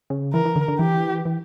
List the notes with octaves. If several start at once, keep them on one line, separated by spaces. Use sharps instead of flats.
C#3
E3 A#4
E3
D3
D3
E3 G4
E3